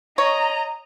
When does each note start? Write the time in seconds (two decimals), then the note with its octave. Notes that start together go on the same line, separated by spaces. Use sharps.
0.18 C#5 D#5 A#5